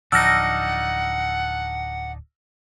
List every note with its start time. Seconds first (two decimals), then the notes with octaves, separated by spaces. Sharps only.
0.12 D1 F3 D4 D#4 F#5 E6 F6 A#6